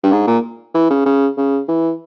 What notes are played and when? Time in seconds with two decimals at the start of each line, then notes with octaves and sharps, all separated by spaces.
0.03 G2
0.12 G#2
0.27 A#2
0.74 E3
0.90 C#3
1.06 C#3
1.37 C#3
1.68 E3